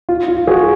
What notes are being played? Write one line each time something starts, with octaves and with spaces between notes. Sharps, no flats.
F4
F4
F#4 G#4